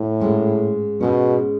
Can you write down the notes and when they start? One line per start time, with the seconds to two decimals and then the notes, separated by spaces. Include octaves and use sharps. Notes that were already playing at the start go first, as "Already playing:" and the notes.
Already playing: A2
0.20 G#2 G#3 C#4
1.00 G#2 B2 G#3 C#4